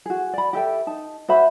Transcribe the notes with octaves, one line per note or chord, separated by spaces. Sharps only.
F#4 G#4
D5 B5
G4 A4 E5 G5
D#4 A5
F#4 C5 E5 B5